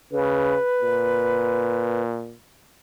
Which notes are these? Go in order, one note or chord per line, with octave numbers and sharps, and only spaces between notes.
C#3 B4
A#2